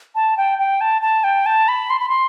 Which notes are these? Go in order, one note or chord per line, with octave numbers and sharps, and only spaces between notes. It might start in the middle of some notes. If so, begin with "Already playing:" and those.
A5
G5
G5
A5
A5
G5
A5
B5
C6
B5
C6